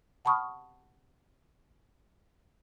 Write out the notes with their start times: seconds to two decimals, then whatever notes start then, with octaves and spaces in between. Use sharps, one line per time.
0.25 F#5 A5 B5 C#6 D#6 F6